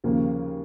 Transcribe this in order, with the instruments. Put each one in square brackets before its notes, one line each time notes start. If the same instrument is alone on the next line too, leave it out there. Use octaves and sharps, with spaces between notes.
[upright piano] D#2 C#3 F3 A#3